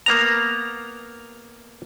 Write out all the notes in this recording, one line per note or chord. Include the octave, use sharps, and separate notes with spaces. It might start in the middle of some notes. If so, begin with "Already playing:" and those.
A#3 B3 A#5